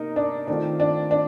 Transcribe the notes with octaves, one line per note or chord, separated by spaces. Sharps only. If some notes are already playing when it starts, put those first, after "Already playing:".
Already playing: C3 A#3 D#4 A#4
D4
D#3 A3 C4 D4 F4
D4
D4